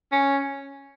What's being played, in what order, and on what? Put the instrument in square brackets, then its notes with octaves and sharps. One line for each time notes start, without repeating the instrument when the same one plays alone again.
[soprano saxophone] C#4